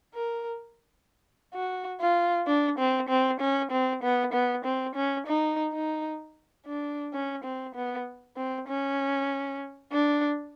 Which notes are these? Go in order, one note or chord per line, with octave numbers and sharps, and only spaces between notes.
A#4
F#4
F4
D4
C4
C4
C#4
C4
B3
B3
C4
C#4
D#4
D#4
D4
C#4
C4
B3
C4
C#4
D4